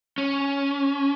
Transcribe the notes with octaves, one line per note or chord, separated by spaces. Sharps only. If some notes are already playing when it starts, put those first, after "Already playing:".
C#4